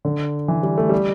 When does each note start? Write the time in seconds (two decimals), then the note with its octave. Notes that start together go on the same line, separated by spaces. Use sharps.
0.05 D3
0.48 E3
0.63 G3
0.77 A3
0.89 G3